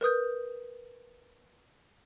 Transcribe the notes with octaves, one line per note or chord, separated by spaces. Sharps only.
A#4 B4 D#6 G6